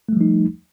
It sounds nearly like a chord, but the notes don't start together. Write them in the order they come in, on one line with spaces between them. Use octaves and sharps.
A3 G3 F3 D#4